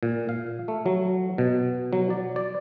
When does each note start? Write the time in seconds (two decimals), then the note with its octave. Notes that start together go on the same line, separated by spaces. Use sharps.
0.03 A#2
0.29 F5
0.68 A3
0.86 F#3
1.38 B2
1.93 F#3
2.10 D5
2.36 D5